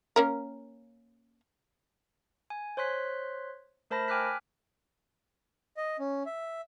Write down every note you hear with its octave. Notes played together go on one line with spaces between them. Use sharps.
A#3 C#4 A#4
G#5
C5 C#5 C6 F#6 B6
A3 A#4 C5 A5 B5 A#6
G5 G#5 D6 F6 F#6 B6
D#5
C#4
E5